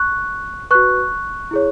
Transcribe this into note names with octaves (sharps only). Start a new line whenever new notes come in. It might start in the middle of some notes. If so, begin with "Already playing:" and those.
Already playing: C#6 F#6
F#4 B4 C#6 F#6
E4 G#4 C#5